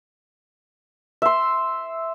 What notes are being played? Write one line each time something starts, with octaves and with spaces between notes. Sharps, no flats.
E5 C6